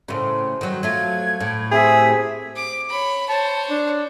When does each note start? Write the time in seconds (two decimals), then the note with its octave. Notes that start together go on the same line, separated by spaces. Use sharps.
0.08 A2 C#3 C5 C6
0.61 D#3 F#3
0.83 F#3 A3 F4 G#6
1.40 A2 D6
1.72 C4 G4 G#4 E5 A5
2.56 D6
2.89 C#5 B5
3.29 C5 C#5 A5
3.70 D4